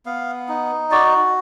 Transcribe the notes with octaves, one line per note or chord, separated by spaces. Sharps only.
B3 F5
D#4
F#4 D5